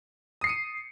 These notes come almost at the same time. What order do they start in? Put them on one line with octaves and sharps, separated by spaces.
D#6 C7 C#7 D#7